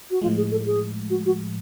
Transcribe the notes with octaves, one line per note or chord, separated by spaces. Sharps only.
F#4
A2 F3 G#3 F4
G#4
A4
G#4
F#4
F#4